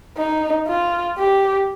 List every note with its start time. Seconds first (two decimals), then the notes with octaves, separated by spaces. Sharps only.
0.17 D#4
0.68 F4
1.18 G4